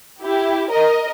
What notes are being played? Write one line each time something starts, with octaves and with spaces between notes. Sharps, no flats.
E4 G4
A#4 D#5